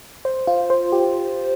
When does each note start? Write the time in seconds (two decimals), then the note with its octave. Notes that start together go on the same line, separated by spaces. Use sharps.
0.25 C5
0.47 F4
0.70 C5
0.92 G4